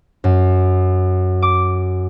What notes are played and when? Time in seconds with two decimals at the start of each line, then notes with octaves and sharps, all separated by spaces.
0.24 F#2
1.42 D6